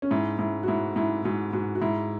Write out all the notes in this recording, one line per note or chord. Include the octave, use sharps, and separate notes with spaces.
C#4
G#2 E4
G#2 E4
F#4
G#2 E4
G#2 E4
G#2 F#4
G#2 F#4
F#4
G#2 E4